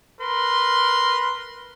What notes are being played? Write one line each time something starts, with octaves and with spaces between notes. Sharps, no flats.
A#4 B4 C6